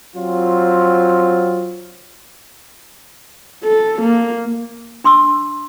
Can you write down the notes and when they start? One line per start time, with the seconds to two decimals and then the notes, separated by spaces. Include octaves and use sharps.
0.16 F#3 C4 F4
3.64 A4
4.02 A#3
5.04 D4 C6 D6 E6